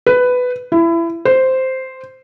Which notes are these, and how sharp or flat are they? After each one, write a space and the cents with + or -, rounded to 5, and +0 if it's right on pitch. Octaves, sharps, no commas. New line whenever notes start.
B4 +10
E4 +25
C5 -5